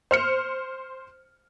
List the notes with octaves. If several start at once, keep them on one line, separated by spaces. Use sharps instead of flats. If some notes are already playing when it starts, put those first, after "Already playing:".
C5 F6 C#7